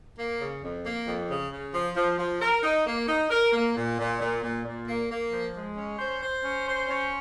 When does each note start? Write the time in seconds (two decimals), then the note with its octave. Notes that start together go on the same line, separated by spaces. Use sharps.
0.18 A#3
0.40 C#3
0.62 F2
0.84 A#3
1.06 F2
1.28 C#3
1.52 C#3
1.73 F3
1.96 F3
2.19 F3
2.41 A#4
2.63 D#4
2.86 A#3
3.08 D#4
3.30 A#4
3.52 A#3
3.76 A#2
3.98 A#2
4.20 A#2
4.43 A#2
4.65 A#2
4.87 A#3
5.09 A#3
5.32 F3
5.54 G#3
5.77 C#4
5.99 C5
6.22 C5
6.44 C#4
6.67 C5
6.89 C#4